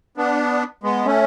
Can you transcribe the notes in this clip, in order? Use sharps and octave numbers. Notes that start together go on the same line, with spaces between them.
B3 D4
G#3 B3
A3 C#4